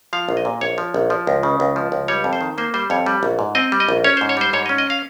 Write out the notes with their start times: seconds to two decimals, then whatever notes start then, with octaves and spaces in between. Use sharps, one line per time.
0.13 F3 F5
0.29 A#1
0.37 D#5
0.45 A#2
0.61 A#1 C#5
0.78 F3
0.94 A#1
1.10 F3
1.27 C#2
1.43 C#3
1.60 C#2
1.76 F3
1.92 C#2
2.08 G3 C#5
2.24 F2
2.33 C5
2.41 D#3
2.58 A#3 C5
2.74 G3 C5
2.90 F2 C#5
3.06 G3
3.23 A#1
3.39 G#2
3.55 C4 D#5
3.72 G3
3.80 D#5
3.89 A#1
4.04 C#4 C#5
4.17 C5
4.21 G#2
4.29 C#5
4.37 G3 C5
4.53 G#2 C#5
4.66 D#5
4.69 C#4
4.78 D#5
4.90 F5